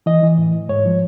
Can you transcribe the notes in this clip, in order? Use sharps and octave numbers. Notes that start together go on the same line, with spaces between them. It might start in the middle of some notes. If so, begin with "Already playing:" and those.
E3 D#5
E3
A2
A2
G#2 C#5
F3